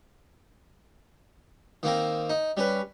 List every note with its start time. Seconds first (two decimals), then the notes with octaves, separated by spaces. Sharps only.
1.83 D#3 A#3 C4 A#4
2.29 D#4
2.57 G3 C#4 B4